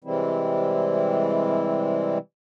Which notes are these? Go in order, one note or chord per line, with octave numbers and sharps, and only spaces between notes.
C3 E3 G3 G#3 C4 E4